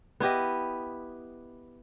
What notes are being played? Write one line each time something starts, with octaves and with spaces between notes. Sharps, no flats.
B3 E4 G4 D#5